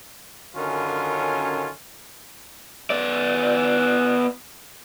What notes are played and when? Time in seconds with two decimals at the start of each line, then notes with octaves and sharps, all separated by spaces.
0.56 F#2 D3 D#3 C#4 F4 G#5
2.90 B3 D5